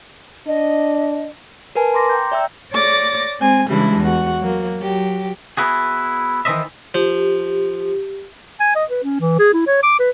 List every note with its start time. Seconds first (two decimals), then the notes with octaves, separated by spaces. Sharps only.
0.47 D4 D#5
1.75 A#4 B4 G#5 A5
1.94 A#5 C6 D6 A#6
2.10 G5 A#5 G6
2.32 D5 E5 G5 A#5 E6
2.72 C#5 D5 D6 A6 A#6
3.39 G#3 C4 G#5
3.69 C#3 E3 G3 G#3 D4 E4
4.00 E2 F#4
4.41 F#3 A#3
4.81 F#3 G4
5.57 B3 E4 F#4 G#4
6.45 D#3 E3 C#4 C5 D#5 E5
6.94 F3 G4
8.60 G#5
8.75 D#5
8.90 B4
9.04 C#4
9.20 E3
9.39 G#4
9.53 E4
9.67 C#5
9.83 D6
9.99 B4